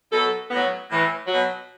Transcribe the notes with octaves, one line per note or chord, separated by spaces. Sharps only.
B2 F#3 A4
A2 F#3 B3
A2 E3
B2 F#3 F#4